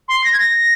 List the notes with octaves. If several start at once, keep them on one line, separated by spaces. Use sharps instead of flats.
C6
A#6
G#6
A#6